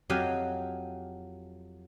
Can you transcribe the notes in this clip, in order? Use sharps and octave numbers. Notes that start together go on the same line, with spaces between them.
F2 F#3 G4 D#5 F5 G#5